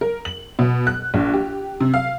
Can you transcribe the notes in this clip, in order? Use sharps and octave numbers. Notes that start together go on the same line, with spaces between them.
A#4
F#7
B2
F#6
A#1
G4
C3
F5